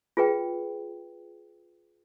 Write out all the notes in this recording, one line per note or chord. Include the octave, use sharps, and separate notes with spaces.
F4 G#4 B4 G5